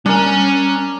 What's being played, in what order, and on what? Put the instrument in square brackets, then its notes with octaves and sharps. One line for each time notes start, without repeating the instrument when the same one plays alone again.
[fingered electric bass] G3 [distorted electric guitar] C#4 G#5 [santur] D4 A#4